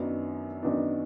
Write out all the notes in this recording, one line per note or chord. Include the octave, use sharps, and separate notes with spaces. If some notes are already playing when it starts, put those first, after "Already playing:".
Already playing: F#2 D#3 F#3 B3 D4
F#2 D#3 F#3 B3 D4